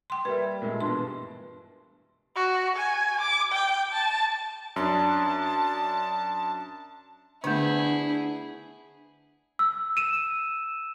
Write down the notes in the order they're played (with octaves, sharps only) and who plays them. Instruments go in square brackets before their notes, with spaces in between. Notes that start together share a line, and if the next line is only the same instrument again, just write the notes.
[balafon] G5 C6
[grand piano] G3 A#3 E5 [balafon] B4
[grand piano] A#2 G#3 A3
[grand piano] G2 B2 E3 [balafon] C6
[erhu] F#4
G#5
D6
G5
A5
[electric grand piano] F#2 D4 [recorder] A5
[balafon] D3 A3 [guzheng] B3 [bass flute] D4 [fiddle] E4 G#4
[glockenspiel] E6
D#7 E7